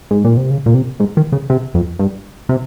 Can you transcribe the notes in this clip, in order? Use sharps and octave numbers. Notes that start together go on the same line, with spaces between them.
G#2
A#2
C3
C#3
A#2
C3
G#2
D#3
C#3
C3
F2
G2
C3